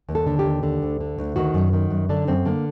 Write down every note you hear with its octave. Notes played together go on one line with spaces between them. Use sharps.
D#2
A4
D3
G4
D#2
D3
D2
D3
D2
D#3 F#4
F#2
D#3
F#2
D3 D4
F#2 C4
D3 A#3